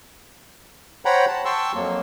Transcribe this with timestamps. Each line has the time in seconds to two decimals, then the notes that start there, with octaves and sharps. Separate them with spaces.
1.05 C5 C#5 F#5 G5 A#5 B5
1.28 A5
1.45 G5 A5 C6 C#6 E6
1.74 F2 F#3 A#3